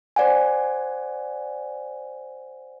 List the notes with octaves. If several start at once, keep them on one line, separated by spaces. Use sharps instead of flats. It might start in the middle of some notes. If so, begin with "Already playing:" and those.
C5 D5 F#5 G#5